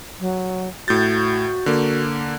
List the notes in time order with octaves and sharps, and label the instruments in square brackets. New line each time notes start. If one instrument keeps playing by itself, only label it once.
[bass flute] F#3
[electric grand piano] A2 G6 A6 [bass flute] F#4
[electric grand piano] D3 A#3